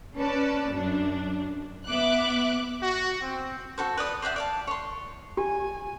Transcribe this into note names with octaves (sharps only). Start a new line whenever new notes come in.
C#4 B4 D5 A5
F#2 D4
B3 E5 D6 F#6
F#4
C4
F#4 A4 C5
B4 D5 D#6
C5 D5 E5 F#5
D5 F5 A5
C#5 C6
G4 G#5